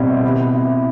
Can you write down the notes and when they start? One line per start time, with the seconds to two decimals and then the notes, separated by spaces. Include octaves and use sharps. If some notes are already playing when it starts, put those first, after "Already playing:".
Already playing: B2 G3 C4 E4
0.23 B3
0.54 E4